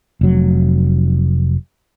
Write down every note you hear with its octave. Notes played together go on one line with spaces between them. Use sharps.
F1 F#3